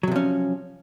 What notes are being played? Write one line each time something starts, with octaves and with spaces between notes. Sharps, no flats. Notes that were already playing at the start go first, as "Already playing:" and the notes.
C3 F3 F#3 C#4